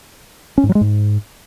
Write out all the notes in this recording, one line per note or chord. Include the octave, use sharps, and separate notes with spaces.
C#4
G#2
F#3
G#3
G#2